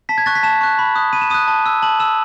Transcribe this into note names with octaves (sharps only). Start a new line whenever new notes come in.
A5 B6
G#6
C#6 F#6 A6
B6
A5 E7
C#6 F#6
B5
D#6 F#6
B5 D#7
E7
D#6 F#6 D#7
A5
E6
A5 F#7
E6 E7